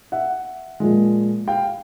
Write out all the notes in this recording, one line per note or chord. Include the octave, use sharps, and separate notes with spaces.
E5 F#5
A#2 F3 G#3
F5 G5